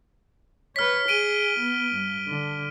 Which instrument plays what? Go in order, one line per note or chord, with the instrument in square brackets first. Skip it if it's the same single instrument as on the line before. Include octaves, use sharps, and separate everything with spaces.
[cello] B4 C#5 [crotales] F6 B6
[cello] G#4 [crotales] D7 D#7 G7
[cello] B3
G2
D3